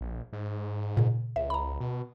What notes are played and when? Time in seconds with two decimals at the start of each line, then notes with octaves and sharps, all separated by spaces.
0.01 A#1
0.33 G#2
0.97 A#2 C#3
1.36 C#2 E5
1.50 A#5 B5
1.80 B2